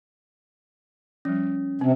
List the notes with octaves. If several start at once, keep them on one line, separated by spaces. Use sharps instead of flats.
F3 G3 C#4
C3 C4